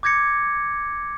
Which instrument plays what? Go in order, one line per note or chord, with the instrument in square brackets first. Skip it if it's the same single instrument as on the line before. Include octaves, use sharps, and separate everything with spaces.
[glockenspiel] D6 G6 G#6 A#6 C#7